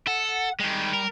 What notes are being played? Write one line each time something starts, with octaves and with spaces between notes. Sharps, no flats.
A4 F#5
D#3 G3 G#3
A#4